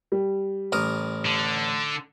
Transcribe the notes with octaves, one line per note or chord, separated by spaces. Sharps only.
G3
A1 A#4 D#6
D3